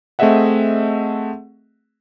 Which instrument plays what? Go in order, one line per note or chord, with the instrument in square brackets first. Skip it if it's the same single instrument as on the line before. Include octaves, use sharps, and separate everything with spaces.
[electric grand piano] A3 C4 G#4 D#5 E5 F#5